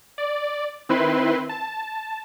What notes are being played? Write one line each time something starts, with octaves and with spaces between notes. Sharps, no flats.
D5
D#3 C4 E4 B4 C6
A5